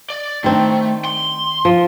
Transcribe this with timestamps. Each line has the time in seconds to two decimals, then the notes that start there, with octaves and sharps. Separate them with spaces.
0.10 D5
0.44 D#3 A3 C4 D4
1.05 C6
1.65 F3